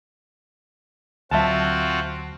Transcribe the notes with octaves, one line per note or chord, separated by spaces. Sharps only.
D2 F#3 C4 F4 F#4 E5 A5